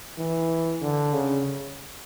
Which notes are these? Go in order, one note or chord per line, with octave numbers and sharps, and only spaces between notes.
E3
D3
C#3